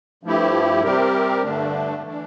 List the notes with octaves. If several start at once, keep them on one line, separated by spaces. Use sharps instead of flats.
G2 F3 A3 E4 G4
C3 G3 C4 G4 A#4
G2 D3 A3 D4
E3 A3 D4